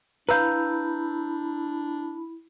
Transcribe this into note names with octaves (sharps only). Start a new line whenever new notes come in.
D4 E4 B4 F5 A#5 B5 E6 G6